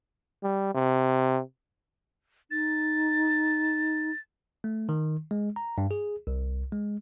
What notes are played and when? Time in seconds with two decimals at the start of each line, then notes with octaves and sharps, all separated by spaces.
0.43 G3
0.74 C3
2.51 D#4 A6
4.64 A3
4.89 D#3
5.31 G#3
5.56 A#5
5.78 G2
5.91 G#4
6.27 C2
6.72 G#3